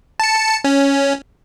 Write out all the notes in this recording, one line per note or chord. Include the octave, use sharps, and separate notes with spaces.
A5 C#7
C#4